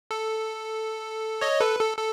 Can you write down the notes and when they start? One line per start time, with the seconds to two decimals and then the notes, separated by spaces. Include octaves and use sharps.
0.11 A4
1.41 C#5 D#5
1.61 A4 B4
1.80 A4
1.98 A4